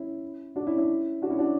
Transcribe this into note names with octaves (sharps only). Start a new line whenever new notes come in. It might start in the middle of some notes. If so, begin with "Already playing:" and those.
Already playing: C#4 E4
D4 F#4
C#4 E4
C#4 E4
D4 F#4
C#4 E4
D4 F#4